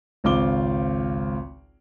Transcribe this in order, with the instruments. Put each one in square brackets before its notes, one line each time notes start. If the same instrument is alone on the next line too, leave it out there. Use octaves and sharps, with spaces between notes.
[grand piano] G#1 C#2 C4 F4 D6 G7